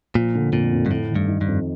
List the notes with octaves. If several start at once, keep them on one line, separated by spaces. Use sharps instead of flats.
A#2 F3
D3
F2 A#2
F2
G2
A2 A3
D#3
G2
D#4
G2
F2